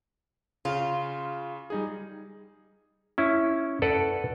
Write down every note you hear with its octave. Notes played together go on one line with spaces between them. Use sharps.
C#3 F4
G3 D#4 G#4
C#4 E4
A4 B4 D5 F#5